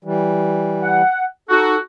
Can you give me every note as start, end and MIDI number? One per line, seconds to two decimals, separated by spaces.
0.04 1.02 52
0.04 1.02 55
0.82 1.24 78
1.49 1.75 63
1.49 1.75 66
1.49 1.78 69